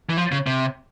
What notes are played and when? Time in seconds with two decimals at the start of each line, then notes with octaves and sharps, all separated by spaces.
0.10 E3
0.17 F3
0.32 C#3
0.47 C3